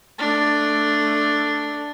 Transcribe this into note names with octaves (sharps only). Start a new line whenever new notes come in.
A3 D4